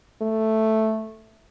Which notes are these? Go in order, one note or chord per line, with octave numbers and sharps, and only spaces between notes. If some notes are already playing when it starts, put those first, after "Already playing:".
A3